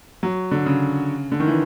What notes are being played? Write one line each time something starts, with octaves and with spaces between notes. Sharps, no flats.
F#3
D3
C#3
D3
D#3
E3